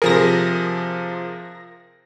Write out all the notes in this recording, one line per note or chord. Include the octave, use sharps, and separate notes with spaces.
C3 F3 G#4 A#4 A#6